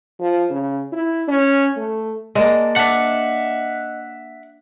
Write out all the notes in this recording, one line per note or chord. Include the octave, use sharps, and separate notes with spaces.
F3
C#3
E4
C#4
A3
G#3 A#3 D5 D#5 A5
D4 E5 F#5